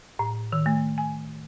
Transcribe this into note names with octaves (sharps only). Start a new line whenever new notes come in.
A2
D#3
A3
G#5